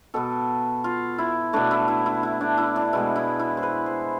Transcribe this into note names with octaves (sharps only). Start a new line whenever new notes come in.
B2 B3 A4
F4
E4
B2 A3 D4
E4
E4
E4
E4
D4
E4
D4
B2 G#3 B3 E4
E4
E4
C5
B4
C5